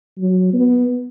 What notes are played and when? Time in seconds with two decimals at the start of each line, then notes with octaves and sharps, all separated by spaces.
0.18 F#3
0.53 B3